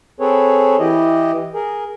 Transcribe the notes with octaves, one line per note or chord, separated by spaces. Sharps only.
C4 G#4 A4 B4 C#5
E3 E4 G4 D#5
G#4 A#4